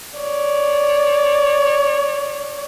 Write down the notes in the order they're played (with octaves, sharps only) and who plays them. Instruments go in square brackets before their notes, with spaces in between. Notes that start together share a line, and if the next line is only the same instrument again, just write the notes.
[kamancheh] C#5 D5